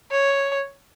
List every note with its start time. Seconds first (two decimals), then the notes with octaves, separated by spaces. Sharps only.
0.11 C#5